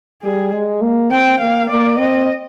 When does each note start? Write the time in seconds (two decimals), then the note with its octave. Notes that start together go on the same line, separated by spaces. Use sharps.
0.23 G3 G#4
0.52 G#3
0.81 A#3
1.11 C4 G5
1.40 A#3 F5
1.69 A#3 D5
1.98 C4 D#5